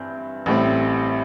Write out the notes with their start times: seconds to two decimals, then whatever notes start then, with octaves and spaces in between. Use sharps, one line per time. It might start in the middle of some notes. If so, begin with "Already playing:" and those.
Already playing: G2 E3 C4 G6
0.46 A1 A2 G3 C4